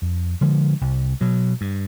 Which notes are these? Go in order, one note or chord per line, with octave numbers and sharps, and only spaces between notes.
F2
D3 F3 G#3
C2
B2 F#3
G2